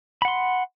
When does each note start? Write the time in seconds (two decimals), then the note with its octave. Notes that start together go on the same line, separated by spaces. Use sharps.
0.22 B5
0.25 F#5
0.28 C6